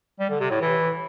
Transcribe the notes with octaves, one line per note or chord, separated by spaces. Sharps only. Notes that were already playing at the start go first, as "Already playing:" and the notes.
G3
D3
C3
A2
E3